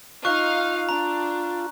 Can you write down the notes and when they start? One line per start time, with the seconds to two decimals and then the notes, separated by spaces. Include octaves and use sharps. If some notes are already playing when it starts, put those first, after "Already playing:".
0.25 D#4 F4 F5 C#6 F#6
0.89 D4 A#5